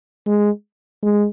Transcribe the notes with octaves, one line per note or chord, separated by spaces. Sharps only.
G#3
G#3